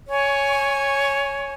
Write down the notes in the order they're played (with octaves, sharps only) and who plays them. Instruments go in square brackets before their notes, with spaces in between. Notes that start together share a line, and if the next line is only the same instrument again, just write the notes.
[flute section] C#5 G#5 C#6